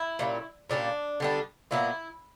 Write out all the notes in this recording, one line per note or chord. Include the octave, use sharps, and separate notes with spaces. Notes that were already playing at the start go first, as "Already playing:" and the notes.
Already playing: E4
A#2 G3 C#4
A#2 G3 C#4 D4
D3 G3 B3 D4
A#2 F#3 B3 E4